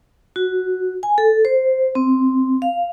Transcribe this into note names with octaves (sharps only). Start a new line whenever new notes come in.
F#4
G#5
A4
C5
C4
F5